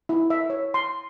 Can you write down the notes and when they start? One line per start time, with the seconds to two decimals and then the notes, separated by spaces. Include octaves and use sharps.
0.09 E4
0.30 E5
0.50 C#5
0.74 C6